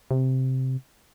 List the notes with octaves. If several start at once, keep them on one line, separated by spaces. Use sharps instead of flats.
C3